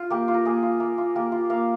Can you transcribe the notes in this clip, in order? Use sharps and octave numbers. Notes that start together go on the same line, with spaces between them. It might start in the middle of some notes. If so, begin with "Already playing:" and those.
Already playing: F4
A#3 G4
F4
A#4
A#3 G#4
F4
A#3
F4
A#3 G4
F4
A#3 F5